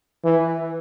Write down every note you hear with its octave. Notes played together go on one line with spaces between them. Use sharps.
E3